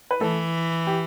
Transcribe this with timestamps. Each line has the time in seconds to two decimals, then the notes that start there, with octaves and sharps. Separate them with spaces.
0.11 B4
0.21 E3 A3 A4
0.87 G4